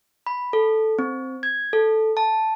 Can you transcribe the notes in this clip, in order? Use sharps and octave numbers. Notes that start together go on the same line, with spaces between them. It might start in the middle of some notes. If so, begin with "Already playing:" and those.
B5
A4
C4
G#6
A4
A5